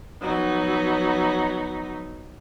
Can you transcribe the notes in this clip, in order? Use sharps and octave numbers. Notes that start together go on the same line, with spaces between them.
F3 F#3 B3 D#4